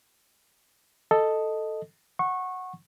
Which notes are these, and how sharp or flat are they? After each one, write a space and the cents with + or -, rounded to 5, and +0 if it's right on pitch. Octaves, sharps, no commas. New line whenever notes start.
A4 +0 D#5 +0
F#5 +0 C#6 -20